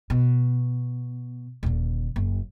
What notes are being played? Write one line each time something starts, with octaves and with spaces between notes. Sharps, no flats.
B2
D#1 D3
F#1